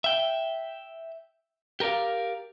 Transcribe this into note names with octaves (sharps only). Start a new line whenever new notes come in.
E5 G5
G4 A#4 B4 D5 F5